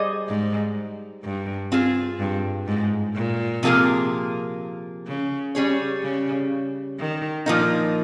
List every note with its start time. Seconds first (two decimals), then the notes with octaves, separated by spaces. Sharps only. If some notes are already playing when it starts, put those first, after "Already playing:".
Already playing: G3 G#4 C5 D#5
0.28 G#2
1.23 G2
1.72 C4 F4 G#4
2.19 G2
2.67 G#2
3.15 A#2
3.63 C3 F3 A#3 F4 G#4
5.07 C#3
5.55 G3 C#4 G#4 C#5
6.03 C#3
6.99 D#3
7.46 A#2 F3 A#3 D#4